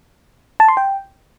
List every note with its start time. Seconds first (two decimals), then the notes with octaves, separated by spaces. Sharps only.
0.60 A5
0.68 C6
0.77 G5